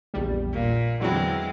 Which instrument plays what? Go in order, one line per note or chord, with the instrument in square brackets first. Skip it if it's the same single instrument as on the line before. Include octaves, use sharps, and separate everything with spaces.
[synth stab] A#1 E2 G3
[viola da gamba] A#2
[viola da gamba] E2 G#3 C4 [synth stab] D3 F#3 E4